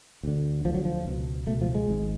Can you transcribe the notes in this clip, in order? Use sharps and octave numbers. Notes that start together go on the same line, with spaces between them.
D2 D3
D2 D3 F3
F#3
F3
C#2 B2
C#2 B2 A3
F3
G#3
G#1 G#2